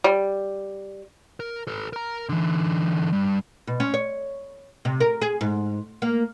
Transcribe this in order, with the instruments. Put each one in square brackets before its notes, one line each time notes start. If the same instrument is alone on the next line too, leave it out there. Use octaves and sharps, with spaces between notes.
[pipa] G3
[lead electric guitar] A#4
A4 B4
A#4 A#5
D3 E3
G2
[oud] B2
C#4
C#5
C3
A#4
G#4
G#2
A#3